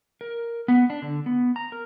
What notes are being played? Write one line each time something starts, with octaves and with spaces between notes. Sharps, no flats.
A#4
B3
D4
D3
B3
A#5
A#4